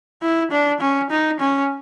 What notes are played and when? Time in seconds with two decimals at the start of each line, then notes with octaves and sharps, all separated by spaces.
0.22 E4
0.51 D4
0.80 C#4
1.10 D#4
1.40 C#4